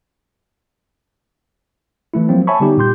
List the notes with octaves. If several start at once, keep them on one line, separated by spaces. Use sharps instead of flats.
E3 A3 E4
F3 F#3 A#3 C4
C#5 E5 G#5 A5 B5 C#6
D3 G3 B3 D#4 G4
A#2 G4 C6 G6